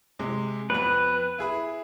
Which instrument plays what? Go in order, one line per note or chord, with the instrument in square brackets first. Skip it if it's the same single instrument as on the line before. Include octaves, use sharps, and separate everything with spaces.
[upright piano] C3 G#3
[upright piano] F2 B3 [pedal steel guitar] B4
[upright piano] E4 G#4 B5